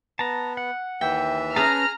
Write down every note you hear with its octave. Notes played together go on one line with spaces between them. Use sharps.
B3 A5 A#5
F#5
D#2 E3 E5 G5
C#4 G#4 B4 A5 A#5 F6